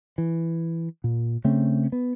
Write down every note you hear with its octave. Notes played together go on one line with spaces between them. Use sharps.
E3
A#2
C#3 A3 C4 C#4
B3